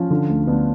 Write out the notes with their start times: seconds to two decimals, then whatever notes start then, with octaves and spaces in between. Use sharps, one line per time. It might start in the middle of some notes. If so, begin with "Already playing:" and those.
Already playing: F3 C#4 F4
0.10 D3
0.29 D2
0.47 D2 B3 D4